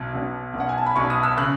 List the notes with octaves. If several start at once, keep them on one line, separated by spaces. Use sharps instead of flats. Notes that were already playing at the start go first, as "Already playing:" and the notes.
Already playing: B1 B2
B1 B2
B1 B2
F#5
G#5
A5
B5
B1 B2 C#6
D#6
E6
C#3 F#6